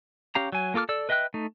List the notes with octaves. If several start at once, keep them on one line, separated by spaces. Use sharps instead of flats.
C#4 G4 F5 A#5
F#3 G#5
A#3 F4 A4 D6 F6
A4 D5 E6
B4 D#5 E5 G5 F#6
A3 D#4